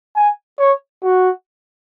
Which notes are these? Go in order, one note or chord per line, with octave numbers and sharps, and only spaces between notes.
G#5
C#5
F#4